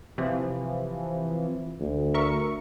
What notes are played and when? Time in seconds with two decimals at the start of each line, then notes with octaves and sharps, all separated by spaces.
0.18 C3 E3 F3
1.80 D2
2.14 A#4 E5 C#6